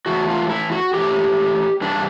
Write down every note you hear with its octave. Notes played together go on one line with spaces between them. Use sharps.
A2 E3 F#4
F4
E4
F#4
A2 E3 G4
G2 E3 D4